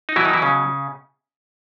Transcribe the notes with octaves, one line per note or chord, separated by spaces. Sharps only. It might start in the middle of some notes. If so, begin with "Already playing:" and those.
D#4
B2 E3 F#3 E4
D#3 D#4
E3 E4
C#3 C#4